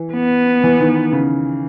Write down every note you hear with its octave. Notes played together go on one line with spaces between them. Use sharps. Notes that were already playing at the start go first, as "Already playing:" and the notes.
Already playing: E3
B3
E3
D#3
C#3